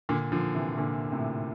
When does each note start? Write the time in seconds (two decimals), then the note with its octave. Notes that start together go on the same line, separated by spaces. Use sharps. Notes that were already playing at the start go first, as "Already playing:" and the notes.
0.09 A#2 D3
0.32 D3 F3
0.55 C3 E3
0.78 A#2 D3
1.12 A2 C3